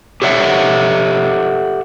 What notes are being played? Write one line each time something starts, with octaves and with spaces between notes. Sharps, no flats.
G4 A4 C#5 E5 F#5